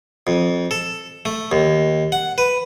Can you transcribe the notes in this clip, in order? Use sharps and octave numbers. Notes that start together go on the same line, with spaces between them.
F2
A4
A3
D#2
F#5
B4